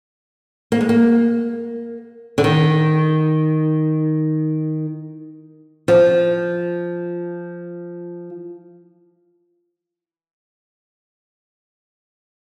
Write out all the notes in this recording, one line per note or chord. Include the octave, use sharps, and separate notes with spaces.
A#3
G#3
A#3
D3
D#3
F3